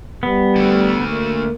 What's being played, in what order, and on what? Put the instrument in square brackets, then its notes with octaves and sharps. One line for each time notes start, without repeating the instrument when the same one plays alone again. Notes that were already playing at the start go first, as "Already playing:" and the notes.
[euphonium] G3 [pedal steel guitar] B3
[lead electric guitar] D3 A3
[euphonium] A#3